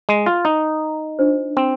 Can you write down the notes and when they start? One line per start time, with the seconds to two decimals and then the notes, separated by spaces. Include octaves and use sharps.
0.09 G#3
0.26 F4
0.45 D#4
1.19 D4 F4 C5
1.57 C4